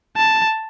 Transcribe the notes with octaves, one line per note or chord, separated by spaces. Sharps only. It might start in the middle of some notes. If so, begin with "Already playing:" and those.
A5